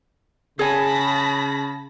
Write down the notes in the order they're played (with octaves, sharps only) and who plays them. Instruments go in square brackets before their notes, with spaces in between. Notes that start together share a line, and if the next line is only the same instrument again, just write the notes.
[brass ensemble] C#3 [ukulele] G#4 C#5 G#5 [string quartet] A5 B5 A#6